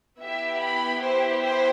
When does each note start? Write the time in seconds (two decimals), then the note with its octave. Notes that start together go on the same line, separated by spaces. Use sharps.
0.21 B3 E4 G4 E5
0.61 B5
1.01 C5
1.42 C5